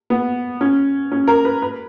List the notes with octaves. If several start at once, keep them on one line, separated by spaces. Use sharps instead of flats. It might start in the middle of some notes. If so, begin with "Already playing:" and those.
B3
C#4
C#4
A#4
B4
B4